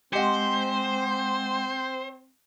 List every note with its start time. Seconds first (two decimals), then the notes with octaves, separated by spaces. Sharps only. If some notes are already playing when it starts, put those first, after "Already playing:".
0.13 G#3 C4 G4 C5 D#5 F#5 C6